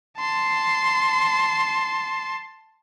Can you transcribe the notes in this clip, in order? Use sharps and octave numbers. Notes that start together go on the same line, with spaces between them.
A5 C6